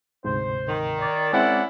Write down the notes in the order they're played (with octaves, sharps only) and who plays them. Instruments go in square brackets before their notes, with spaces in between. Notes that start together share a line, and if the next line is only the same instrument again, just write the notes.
[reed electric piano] D2 G#2 C3 [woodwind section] C5
[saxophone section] D#3
[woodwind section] A#4 C#5 D5
[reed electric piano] G#3 C4 [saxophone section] C#4 E4 [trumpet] F#5